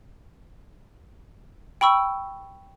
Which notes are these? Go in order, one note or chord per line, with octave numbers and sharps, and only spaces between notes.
G5 B5 C#6 E6